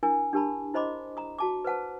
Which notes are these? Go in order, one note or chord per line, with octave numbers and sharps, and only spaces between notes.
D4 E4 A#4 G#5
D4 G4 A#4 A5 B5
E4 C5 D#5 B5 C6 D6
A#5 D#6
F#4 A5 D6
B4 C5 F#5 A5